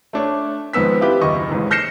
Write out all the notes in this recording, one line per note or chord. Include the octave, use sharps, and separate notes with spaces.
A3 D4 C#5
G#1 F2 G#2 B3 E6 B6
C4 E4 F4 G4 B4
F#1 D#2 D#5 C#6
A1 G#2
F6 G6 A#6 C7 C#7 E7